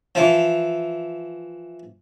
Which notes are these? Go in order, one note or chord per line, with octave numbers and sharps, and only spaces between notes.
E3 F3